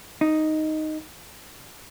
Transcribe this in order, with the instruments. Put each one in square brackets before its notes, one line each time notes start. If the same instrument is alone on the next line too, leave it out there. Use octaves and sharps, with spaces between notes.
[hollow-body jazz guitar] D#4